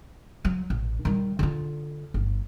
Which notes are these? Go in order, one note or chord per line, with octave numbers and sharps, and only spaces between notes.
F#3
A1
D#3 G3
D3 F4
G1